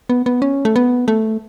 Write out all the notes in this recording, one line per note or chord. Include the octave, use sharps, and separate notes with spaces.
B3
B3
C#4
A3
B3
A3